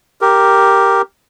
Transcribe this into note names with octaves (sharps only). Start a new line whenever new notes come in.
G4 A#4